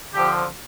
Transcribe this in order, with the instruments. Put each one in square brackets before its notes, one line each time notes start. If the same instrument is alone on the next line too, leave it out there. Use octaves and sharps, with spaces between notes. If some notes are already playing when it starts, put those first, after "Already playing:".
[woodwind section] D3 F3 C4 G4